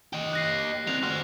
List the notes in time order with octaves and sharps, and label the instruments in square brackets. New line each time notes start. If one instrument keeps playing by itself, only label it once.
[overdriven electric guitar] G4 D#5
[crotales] F#6 A#6 C7
[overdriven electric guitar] G3 C4 [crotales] F#6 F7
[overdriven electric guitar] F#4 C5 [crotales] F6